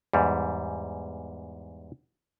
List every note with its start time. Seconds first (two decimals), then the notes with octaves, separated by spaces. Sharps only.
0.13 E2 G#2 G3